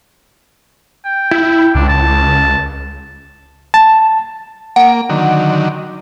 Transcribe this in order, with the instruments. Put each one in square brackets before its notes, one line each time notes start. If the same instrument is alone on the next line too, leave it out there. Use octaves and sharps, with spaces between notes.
[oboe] G5
[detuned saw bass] E4
[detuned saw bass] C#2 [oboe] D4
[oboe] A5
[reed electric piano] A5
[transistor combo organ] A#3 [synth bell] F#5
[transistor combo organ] D3 D#3 F#3